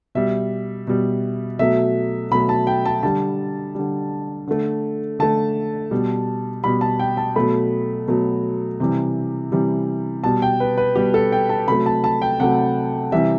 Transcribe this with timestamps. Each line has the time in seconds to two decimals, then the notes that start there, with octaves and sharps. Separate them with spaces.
0.15 B2 G3 E5
0.87 B2 G3
1.59 B2 F#3 A3 E5
2.31 B2 F#3 A3 B5
2.49 A5
2.67 G5
2.86 A5
3.03 D3 G3 A5
3.75 D3 G3
4.47 D3 A3
5.19 D3 A3 A5
5.91 B2 G3
6.64 B2 G3 B5
6.81 A5
6.99 G5
7.17 A5
7.36 B2 F#3 A3 B5
8.08 B2 F#3 A3
8.80 C3 E3 G3
9.52 C3 E3 G3
10.24 B2 G3 A5
10.42 G5
10.60 B4
10.78 B4
10.95 B2 G3 G4
11.14 A4
11.32 G5
11.49 A5
11.68 C3 F#3 A3 B5
11.86 A5
12.04 A5
12.22 G5
12.40 C3 F#3 A3 F#5
13.12 C3 E3 G3 E5